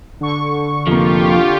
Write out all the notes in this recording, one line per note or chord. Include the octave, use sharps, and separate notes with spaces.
D3 C#6
F1 F3 A#3 F4 G4